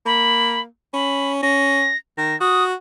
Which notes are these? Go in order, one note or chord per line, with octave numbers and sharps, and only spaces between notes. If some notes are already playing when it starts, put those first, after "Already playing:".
A#3 B5
C#4 B5
C#4 A#6
D#3 A#6
F#4 D#6